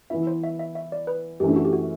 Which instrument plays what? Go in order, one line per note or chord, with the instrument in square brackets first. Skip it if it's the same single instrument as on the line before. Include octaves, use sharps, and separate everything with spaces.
[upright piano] E3 B3 E4 [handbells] E5
[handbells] C5
E5
E5
E5
D5
B4
[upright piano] F#2 E3 A3 [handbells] G4
[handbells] D4
F#4
G4
F#4